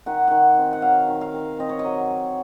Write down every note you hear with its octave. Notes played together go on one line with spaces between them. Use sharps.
D#3 F#5
D#3 F#5
C4
F#5
F#3 F5
D#3
F5
D#3
C4 D#5
C#5
D#5
F#3